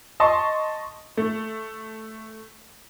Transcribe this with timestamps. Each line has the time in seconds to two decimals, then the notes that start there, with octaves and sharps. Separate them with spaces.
0.20 D#5 A5 C6 C#6
1.17 A3